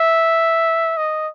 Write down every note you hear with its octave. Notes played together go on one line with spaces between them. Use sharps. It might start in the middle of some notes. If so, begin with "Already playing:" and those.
Already playing: E5
D#5